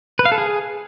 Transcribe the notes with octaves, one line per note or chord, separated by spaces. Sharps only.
B4
F5
A4
G#4